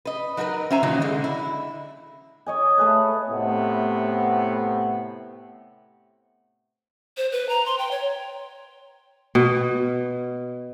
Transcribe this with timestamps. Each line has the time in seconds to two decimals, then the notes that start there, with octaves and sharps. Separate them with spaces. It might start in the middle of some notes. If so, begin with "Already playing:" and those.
0.05 B4 D#5
0.37 F#3 D#4 F#4 A#4 B4
0.70 C#4 C5 E5 G#5 A#5
0.83 A#2 D#3 E3 F#3 A#3
1.02 D3 G#3
1.24 E4
2.46 C#5 D#5 G#5
2.78 A3 G#4 B4
3.29 A2 C3 B3
7.17 C5
7.32 B4
7.49 A#5
7.66 C6
7.78 G5
7.91 C#5
9.35 B2